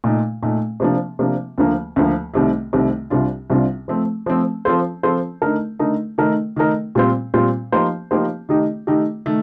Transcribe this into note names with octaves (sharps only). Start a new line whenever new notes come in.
A#2 A3 D#4
A#2 A3 D#4
C3 F3 A#3 D4
C3 F3 A#3 D4
D2 D3 F3 A#3
D2 D3 F3 A#3
C2 C3 D#3 A3
C2 C3 D#3 A3
C2 C3 G3 D4 F4
C2 C3 G3 D4 F4
F3 A3 C4
F3 A3 C4
F3 C4 F4 A4 C5
F3 C4 F4 A4 C5
D3 A3 D#4 A#4
D3 A3 D#4 A#4
D#3 A3 D#4 A#4
D#3 A3 D#4 A#4
A#2 G3 C4 F4 C5
A#2 G3 C4 F4 C5
F3 A#3 D#4 G4 C5
F3 A#3 D#4 G4 C5
D#3 A3 D#4 G4
D#3 A3 D#4 G4
D#3 A3